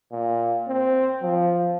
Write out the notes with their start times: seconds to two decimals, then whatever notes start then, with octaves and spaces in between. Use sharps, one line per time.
0.12 A#2
0.68 C4
1.22 F3